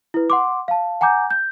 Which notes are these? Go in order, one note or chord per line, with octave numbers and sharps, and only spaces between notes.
E4 B4
F#5 C6 D6
F5 A5
F#5 G#5 A#5 D6 G6
G6